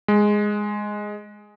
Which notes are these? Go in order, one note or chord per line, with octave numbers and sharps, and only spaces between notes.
G#3